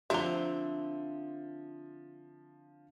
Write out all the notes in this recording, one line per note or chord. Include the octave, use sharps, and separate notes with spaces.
D3 F3 C4 E4 E5 A#5 G7